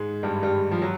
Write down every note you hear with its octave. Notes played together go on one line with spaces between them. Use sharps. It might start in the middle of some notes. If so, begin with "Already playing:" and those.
Already playing: G#2 G#3
G2 G3
G2 G3
F3
F#3